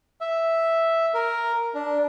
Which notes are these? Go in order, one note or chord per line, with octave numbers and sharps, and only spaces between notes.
E5
A#4
D4